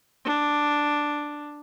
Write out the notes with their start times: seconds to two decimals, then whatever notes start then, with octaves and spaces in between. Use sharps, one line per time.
0.25 D4